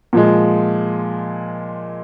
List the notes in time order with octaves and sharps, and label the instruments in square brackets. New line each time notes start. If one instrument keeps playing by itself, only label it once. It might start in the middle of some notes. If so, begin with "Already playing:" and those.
[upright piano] A#2 F3 G#3